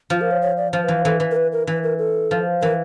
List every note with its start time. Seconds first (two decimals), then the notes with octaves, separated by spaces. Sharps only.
0.10 F3 F4
0.21 A#4
0.31 C#5
0.42 C#5
0.57 D5
0.73 F3 C5
0.84 B4
0.88 E3 C5
1.05 E3 A4
1.20 E3
1.31 A#4
1.36 B4
1.52 A#4
1.67 E3 B4
1.83 A#4
1.98 A4
2.31 F3
2.62 E3 A#4